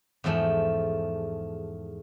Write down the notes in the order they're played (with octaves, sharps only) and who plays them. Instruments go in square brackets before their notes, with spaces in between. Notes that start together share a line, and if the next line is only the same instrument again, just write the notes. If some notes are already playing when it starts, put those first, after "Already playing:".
[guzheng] E2 G#2 F3 A3